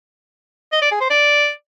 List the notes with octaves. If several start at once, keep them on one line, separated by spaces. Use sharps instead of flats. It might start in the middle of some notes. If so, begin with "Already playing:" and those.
D#5
D5
G#4
C5
D5